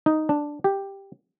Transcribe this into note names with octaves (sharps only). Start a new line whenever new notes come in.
D#4
D4
G4